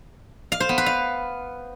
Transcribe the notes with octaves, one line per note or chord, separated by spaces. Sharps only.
F5
C5
B3
B4
F5